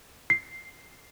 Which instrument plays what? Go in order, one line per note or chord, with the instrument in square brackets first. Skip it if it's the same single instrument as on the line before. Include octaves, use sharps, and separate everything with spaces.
[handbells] C7